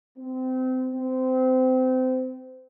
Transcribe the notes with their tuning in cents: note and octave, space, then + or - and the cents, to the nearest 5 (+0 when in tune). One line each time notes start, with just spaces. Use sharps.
C4 -25
C4 -25